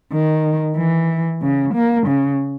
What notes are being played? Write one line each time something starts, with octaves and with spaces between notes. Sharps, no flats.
D#3
E3
C#3
A#3
C#3